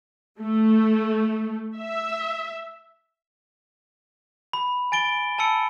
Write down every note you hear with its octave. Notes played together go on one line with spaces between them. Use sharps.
A3
E5
B5
G#5 A6 D7 G7
G#5 A5 B5 E6 C#7